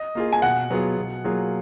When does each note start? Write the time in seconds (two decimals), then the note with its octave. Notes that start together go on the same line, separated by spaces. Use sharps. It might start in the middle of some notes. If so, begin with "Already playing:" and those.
Already playing: D#5
0.15 A#3 F4 G#4
0.32 G#5
0.42 B2 F#5
0.70 F#3 B3 F4 G#4
0.97 B2
1.24 F#3 A#3 F4 G#4